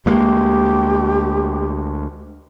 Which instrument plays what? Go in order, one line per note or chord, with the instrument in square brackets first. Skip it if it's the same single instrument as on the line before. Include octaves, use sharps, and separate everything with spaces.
[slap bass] D2 G#3 A#3 [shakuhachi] G4